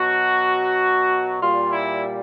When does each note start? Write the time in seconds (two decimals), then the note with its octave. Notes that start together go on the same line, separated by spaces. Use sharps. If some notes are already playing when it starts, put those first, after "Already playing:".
Already playing: B2 F#3 F#4
1.41 A#2 G3 F4
1.72 E4